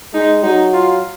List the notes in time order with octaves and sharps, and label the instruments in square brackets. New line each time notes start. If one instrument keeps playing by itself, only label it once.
[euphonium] G#3 [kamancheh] D#4
[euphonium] F#3 [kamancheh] D#4
[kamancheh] F4